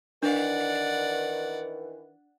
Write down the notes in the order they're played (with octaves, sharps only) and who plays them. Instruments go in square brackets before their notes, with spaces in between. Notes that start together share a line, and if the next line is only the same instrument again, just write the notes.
[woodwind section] D#3 E3 [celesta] D4 [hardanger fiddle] D5 F#5